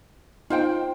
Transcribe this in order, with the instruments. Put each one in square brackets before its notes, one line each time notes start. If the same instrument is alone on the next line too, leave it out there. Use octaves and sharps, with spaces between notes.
[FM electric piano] D#4 [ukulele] F4 C5 G5